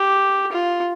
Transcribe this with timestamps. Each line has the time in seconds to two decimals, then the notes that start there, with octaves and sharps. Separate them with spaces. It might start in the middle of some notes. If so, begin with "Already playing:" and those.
Already playing: G4
0.52 F4